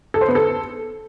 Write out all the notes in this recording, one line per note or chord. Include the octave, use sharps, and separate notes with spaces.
A4
C5
B3
A4